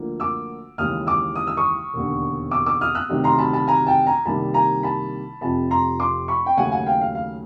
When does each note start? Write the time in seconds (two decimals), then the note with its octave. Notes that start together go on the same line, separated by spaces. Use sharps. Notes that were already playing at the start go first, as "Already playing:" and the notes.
Already playing: D2 D3 F3 A#3
0.20 D6 E6
0.78 D#2 C#3 E3 G#3 D#6 F6
1.07 D6 E6
1.36 D#6
1.47 E6
1.57 C#6 D#6
1.93 E1 D#2 D3
2.51 D6 E6
2.66 D6 E6
2.81 D#6 F6
2.95 E6 F#6
3.09 D2 C3 D#3 F#3
3.24 A#5 C6
3.38 A5 B5
3.53 A5 B5
3.67 G#5 A#5
3.87 G5 A5
4.06 G#5 A#5
4.25 C2 C3 D#3 G3 A#3 A5 B5
4.54 G#5 A#5
4.83 A5 B5
5.41 F1 F2 C3 A5 B5
5.71 A#5 C6
6.00 C6 D6
6.28 B5 C#6
6.46 G5
6.57 D#2 C#3 F#3 A3 F#5 G#5
6.72 F#5 G#5
6.86 F5 G5
7.01 F5
7.15 F5